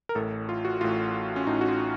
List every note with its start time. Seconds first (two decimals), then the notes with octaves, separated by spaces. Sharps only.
0.09 A#4
0.15 A1 A2 A4
0.49 F4
0.65 F#4
0.81 A1 A2 F4
1.36 C#4
1.47 A1 A2 D#4
1.61 F#4
1.68 F4